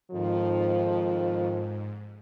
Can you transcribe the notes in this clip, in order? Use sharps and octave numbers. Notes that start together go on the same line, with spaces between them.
F2 G#2 D#3 F3